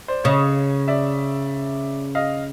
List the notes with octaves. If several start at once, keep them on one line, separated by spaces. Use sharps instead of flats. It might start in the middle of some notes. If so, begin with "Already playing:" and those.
C5 D5
C#3 C#5 D#5
D5 E5
D#5 F5